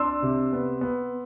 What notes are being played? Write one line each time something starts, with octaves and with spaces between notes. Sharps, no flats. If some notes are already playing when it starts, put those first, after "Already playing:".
Already playing: D4 C6 E6
C3
B3
B3